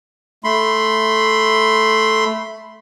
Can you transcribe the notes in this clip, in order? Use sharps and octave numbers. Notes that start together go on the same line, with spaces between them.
A3 B5 C6